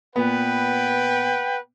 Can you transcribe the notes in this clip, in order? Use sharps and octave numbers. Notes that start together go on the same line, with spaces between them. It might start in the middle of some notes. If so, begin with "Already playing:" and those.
A#2 B3 B4 F#5 G5